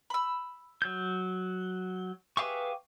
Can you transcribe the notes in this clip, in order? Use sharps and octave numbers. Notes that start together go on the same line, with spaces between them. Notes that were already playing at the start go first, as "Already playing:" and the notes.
B5 E6
F#3 G6
G4 G#4 B4 E5 F5 C#6